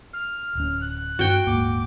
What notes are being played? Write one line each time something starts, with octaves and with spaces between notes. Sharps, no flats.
F6
D1 C#4
F#6
G2 F#4 G5
D#1 G#2 A#3 D6